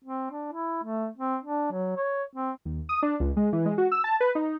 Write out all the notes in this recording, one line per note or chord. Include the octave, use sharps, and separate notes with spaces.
C4
D4
E4
A3
C4
D4
F#3
C#5
C4
D#2
D#6
D4
C#2
G#3
E3
G#3
F#4
E6
A5
B4
D#4